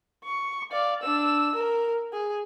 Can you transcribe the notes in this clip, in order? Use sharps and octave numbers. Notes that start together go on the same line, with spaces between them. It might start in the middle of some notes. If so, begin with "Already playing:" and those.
C#6
D5 F5
D4 E6
A#4
G#4